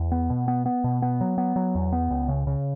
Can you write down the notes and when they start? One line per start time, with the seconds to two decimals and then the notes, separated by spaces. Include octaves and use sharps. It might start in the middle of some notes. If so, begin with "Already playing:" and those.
Already playing: E2
0.12 B3
0.30 B2
0.48 B3
0.66 B3
0.84 B2
1.02 B3
1.21 F#3
1.38 B3
1.56 F#3
1.75 E2
1.92 B3
2.10 C#2
2.28 C#3
2.47 C#3